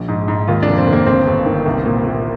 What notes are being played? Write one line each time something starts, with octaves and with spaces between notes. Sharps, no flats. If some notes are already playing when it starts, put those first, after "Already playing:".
Already playing: A#1
G#2
G#2
D#2 F4
F1 D4
C4
D#2
A#3
G1 C4
G1
D#3
C2
A#2
A#2